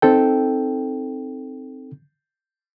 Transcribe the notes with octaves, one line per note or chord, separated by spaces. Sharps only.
C4 D#4 A4 G5